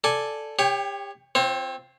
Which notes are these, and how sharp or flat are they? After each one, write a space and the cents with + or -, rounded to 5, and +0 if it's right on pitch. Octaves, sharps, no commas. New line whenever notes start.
A4 +0 D5 +0 G#5 +0
G4 +35 C#5 +0 G5 +5
C4 +0 F4 +0 C#5 -45